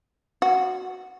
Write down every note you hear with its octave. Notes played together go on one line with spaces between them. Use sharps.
F#4